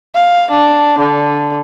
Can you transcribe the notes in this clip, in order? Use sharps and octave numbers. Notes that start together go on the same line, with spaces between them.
F5
D4
D3